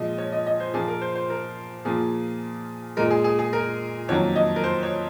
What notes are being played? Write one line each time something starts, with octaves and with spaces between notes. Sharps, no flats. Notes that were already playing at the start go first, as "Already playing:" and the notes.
Already playing: A#2 F3 G#3 D#5
C#5
D#5
D#5
C5
A#2 F3 A#3 G#4
A#4
C5
C5
A#4
A#2 F3 A#3 G#4
A#2 G#3 A#4
G#4
G#4
G#4
A#4
F2 D#3 F#3 A#3 C#5
D#5
A#4
C5
C#5